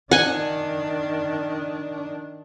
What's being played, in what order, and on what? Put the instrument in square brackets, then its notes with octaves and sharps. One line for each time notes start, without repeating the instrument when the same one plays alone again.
[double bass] D#3 D4 [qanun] F#5 G#5